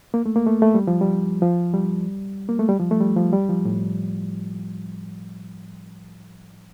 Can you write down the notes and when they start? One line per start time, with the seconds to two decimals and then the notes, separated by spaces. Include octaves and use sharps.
0.14 A#3
0.26 A3
0.36 A#3
0.47 A3
0.62 A3
0.75 G3
0.87 F3
1.01 G3
1.42 F3
1.74 G3
2.49 A#3
2.59 A3
2.69 G3
2.79 F3
2.91 A3
3.01 G3
3.17 F3
3.33 G3
3.49 F3
3.65 A2